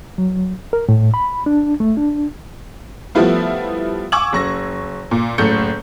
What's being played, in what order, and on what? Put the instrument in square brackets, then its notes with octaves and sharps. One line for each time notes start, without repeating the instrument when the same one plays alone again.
[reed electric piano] F#3
A#4
A2
B5
D4
A3
D4
[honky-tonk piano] F3 G3 A3 B3 E4 F4
G#5 C#6 D6 E6 G#6 F#7
F#1 C#6 A#6
A#2
F#1 A2 A4 G6 C#7